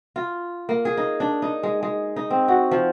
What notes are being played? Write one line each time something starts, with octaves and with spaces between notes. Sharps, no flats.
F4
A#3
G#4
D#4
D4
D#4
G#3
G#3
D#4
C4
F#4
F3